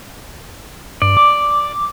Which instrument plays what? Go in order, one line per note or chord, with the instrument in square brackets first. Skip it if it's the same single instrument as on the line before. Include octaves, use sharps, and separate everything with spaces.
[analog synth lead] G2 [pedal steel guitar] D5
[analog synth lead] D6